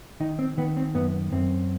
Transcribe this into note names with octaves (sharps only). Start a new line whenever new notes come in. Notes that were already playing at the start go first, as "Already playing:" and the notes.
D#3 D#4
C4
D#3 B3
C4
F#2 B3
F#2 C4